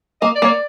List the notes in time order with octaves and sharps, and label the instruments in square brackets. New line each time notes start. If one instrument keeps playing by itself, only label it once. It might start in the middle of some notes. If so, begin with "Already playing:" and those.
[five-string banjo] A#3 [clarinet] D#5
[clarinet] D5
[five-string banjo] A#3 [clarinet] C#5
[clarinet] D5